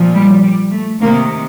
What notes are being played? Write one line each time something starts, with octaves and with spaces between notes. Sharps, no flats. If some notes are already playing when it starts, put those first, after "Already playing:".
Already playing: A#2 F3
G3
G3
A3
C3 D#3 A#3